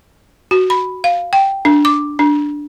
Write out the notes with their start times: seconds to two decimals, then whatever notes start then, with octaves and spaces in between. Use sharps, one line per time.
0.51 F#4
0.70 B5
1.04 F5
1.33 G5
1.65 D4
1.85 D6
2.19 D4